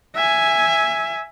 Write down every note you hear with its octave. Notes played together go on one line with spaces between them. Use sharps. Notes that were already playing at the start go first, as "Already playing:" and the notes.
E5 G#5